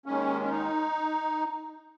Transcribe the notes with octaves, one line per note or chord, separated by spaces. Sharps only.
D#2 D#3 G#3 C#4
C#4
D#4